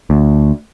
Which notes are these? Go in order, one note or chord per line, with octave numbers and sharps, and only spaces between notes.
D2